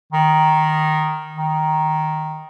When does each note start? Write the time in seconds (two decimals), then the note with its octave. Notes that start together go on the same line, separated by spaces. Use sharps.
0.13 D#3
1.36 D#3